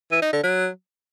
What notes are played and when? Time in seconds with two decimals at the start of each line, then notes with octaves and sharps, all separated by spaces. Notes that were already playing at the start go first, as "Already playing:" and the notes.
0.11 E3
0.22 D#4
0.33 D3
0.43 F#3